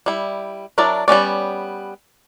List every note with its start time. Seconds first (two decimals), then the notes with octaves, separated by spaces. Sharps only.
0.06 G3 E4
0.78 F#3 D4 E4 A#4 D5
1.08 G3 B3 C#4 D5